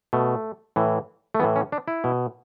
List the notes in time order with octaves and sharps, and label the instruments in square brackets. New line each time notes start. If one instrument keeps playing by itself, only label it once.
[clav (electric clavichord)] B2 A3
A2 E3
A3
A2 E3 B3
C#4
D4
E4
B2